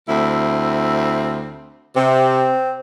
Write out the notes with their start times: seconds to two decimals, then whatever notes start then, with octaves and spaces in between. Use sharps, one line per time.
0.08 D2 C4 E4
1.96 C3 C4